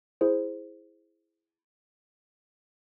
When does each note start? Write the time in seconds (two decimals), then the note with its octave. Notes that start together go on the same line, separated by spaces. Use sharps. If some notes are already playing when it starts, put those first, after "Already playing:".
0.21 E4 G#4 C5